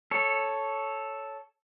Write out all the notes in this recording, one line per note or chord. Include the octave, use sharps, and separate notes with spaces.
A4 C#5